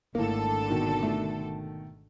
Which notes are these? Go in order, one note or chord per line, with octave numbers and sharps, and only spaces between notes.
G#1 A2 D3 A#3 A4
B2 D#3 F#4
A3